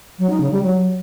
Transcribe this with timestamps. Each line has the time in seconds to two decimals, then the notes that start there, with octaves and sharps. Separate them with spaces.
0.19 F#3
0.30 D#4
0.40 C#3
0.51 G3
0.62 F#3